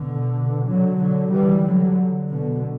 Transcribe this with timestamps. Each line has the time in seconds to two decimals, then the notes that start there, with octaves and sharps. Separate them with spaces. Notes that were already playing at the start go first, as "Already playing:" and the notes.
Already playing: B2 D3
0.67 D3 F#3
0.99 D3 F#3
1.31 E3 G3
1.65 D3 F#3
2.29 B2 D3